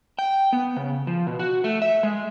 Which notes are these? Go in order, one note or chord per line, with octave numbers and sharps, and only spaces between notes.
G5
B3
C#3
F3
B2
F#4
A3
E5
G#3